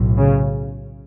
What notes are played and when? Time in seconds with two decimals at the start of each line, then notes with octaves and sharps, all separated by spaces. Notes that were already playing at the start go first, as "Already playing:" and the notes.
Already playing: B1 A2
0.17 C#3